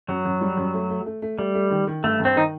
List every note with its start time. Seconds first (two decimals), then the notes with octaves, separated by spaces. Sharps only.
0.08 F#2 F#3
0.25 F#2
0.41 G3
0.57 F#2
0.74 A3
0.90 A3
1.06 A3
1.22 A3
1.38 G3 A3
1.54 A3
1.70 D#3
1.87 D#3
2.04 G2 A3
2.20 G2
2.25 C4
2.36 D#3 D#4